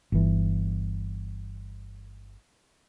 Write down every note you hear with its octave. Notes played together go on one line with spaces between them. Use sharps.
G1 E3